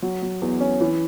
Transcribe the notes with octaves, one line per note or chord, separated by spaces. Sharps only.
F#3
F#3
E2
C#4
E3